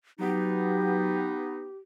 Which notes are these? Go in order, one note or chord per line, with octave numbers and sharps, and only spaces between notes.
F#3 B3 D#4 G4